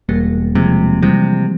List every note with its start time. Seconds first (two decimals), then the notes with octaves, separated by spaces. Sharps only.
0.09 E1 G3 A#3
0.55 C3 F3 G#3
1.02 C3 E3 G3